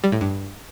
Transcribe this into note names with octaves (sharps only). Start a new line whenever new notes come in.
G3
A2
G2